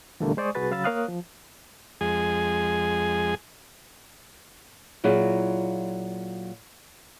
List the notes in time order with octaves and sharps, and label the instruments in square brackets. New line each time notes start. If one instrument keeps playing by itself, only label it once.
[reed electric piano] E2 A#2 D3 G3 A3 A#3
G#3 C5 D5 G#5 C#6 D#6
C2 F#4 G#4 B4 A6
C#3 F#3 F5 B5 E6 A6
A#3 A#4 C#5 F5 D#6 F#6
F3
[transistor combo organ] F2 G#3 G#4
[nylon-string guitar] A#2 F#3 E4 F4 G#4